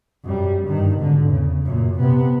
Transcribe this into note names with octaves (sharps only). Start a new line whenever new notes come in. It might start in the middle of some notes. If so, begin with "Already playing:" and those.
F#2 G3
G2 D#3
G#1 D3
E2 C#3
F#2 A#2
C3 B3